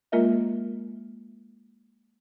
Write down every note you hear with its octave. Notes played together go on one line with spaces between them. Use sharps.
G#3 A#3 F4 A#4 D#5 E5